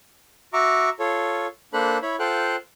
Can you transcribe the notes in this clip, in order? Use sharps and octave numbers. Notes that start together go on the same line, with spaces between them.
F#4 E5 A#5 C#6 D6
F4 A4 C#5
A#3 D4 A4 C5 B5 F#6
E4 C#5 B5
F4 A4 C5 F5 G5 F#6